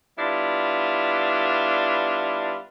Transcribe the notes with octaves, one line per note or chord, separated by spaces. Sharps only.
G3 B3 D4 E4 F4